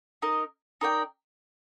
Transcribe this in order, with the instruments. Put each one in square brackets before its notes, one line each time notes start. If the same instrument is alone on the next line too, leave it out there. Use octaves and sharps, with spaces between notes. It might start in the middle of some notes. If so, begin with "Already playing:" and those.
[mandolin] D#4 A#4 D#5
D#4 A#4 D5 G5